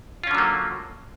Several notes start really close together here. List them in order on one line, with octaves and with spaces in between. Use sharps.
F4 C#4 D3 F#3 A#3